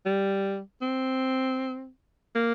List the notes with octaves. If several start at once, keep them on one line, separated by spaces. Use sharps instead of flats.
G3
C4
A#3